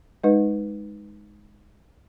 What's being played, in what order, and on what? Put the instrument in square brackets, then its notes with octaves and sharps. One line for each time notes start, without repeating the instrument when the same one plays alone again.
[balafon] G#3 D#4 B4 D#5